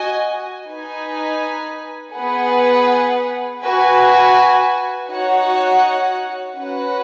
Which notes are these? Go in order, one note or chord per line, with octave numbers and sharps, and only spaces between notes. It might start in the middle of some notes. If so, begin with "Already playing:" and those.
Already playing: F#4 D#5 G#5
D#4 B4 G#5
B3 G#4 B4 F#5
F#4 B4 G#5
D#4 F#4 C#5 F#5
C#4 F#4 B4 F#5